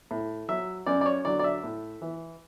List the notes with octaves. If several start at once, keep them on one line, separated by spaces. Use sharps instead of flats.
A2
F#3 E5
F#2 D5
D5
C#5
D3 F#3 D5
D5
E5
A2
E3